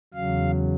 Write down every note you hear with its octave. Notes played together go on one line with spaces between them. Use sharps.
E2 C#3 F#3 F5